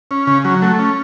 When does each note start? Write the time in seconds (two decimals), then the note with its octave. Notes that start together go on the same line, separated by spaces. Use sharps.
0.11 C#4
0.27 C#3
0.45 F#3
0.62 A3
0.79 C#4